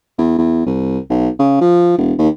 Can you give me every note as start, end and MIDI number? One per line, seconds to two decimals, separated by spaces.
0.18 0.33 40
0.38 0.63 40
0.66 0.98 36
1.10 1.29 35
1.39 1.60 49
1.61 1.94 53
1.98 2.13 28
2.18 2.29 39